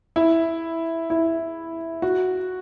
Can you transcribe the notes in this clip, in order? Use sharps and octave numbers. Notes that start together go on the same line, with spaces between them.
E4
E4
F#4